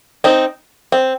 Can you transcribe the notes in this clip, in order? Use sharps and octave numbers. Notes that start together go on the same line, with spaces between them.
C4 D#4
C4